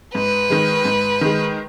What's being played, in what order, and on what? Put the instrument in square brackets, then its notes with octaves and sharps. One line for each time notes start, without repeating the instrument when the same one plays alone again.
[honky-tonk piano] G#2 [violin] B4
[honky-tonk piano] D#3 G#3
G#2
D#3 G#3